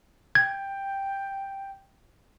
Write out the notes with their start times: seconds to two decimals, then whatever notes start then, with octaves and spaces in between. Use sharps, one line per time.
0.35 G5 G#6